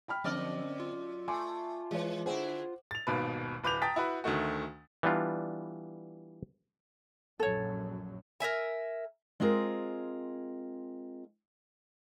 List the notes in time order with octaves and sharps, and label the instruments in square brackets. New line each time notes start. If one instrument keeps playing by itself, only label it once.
[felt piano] G5 B5 F6
[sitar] F#2 D5 D#5 [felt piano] D3 C4 F6 [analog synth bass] F3
[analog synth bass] F4
[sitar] A3 [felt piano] G#5 C6 D6
[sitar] E3 [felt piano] G#3 B4 C#5
[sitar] D3 E4 G#4 [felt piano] C5 F#5
[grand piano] A6 F7
D#1 G#1 D#2 B2 B4
D1 B4 D6 G6 F7
G5 A5 A#5 D#6 A6 B6
E4 F#4 B4
D2 D#3 A3 F#4
[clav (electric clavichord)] E3 G3 B3 D4 F4
[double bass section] A#1 F#2 F#3 [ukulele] A4 C#5
[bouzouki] A#4 B4 E5 G#5
[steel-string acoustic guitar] G#3 C4 F4 G#4 A#4